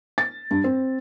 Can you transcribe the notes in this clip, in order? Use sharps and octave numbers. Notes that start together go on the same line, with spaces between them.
A6
G2
C4